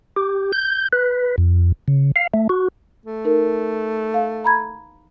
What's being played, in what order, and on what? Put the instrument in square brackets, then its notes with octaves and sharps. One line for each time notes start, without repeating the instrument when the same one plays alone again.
[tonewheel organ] G4
G6
B4
F2
C#3
F5
A3
F#4
[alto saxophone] A3
[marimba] D#4 A#4
F5
A#5 B5 G#6